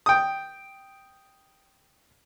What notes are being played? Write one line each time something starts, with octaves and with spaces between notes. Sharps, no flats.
G5 D#6